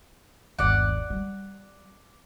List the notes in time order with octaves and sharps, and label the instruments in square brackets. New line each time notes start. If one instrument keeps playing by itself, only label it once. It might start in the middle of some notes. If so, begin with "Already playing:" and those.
[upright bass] G1 D#2 [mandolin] D5 F#5
[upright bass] G3